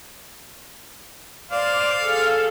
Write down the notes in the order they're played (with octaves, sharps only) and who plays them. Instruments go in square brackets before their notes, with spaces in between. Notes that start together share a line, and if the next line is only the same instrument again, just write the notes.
[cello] C5 D5 [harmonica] F5
[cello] G#4 A4